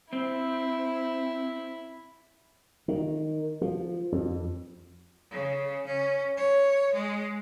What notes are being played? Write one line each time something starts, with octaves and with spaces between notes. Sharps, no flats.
C4 E4
D#3
F3
F2
C#3
C#4
C#5
G#3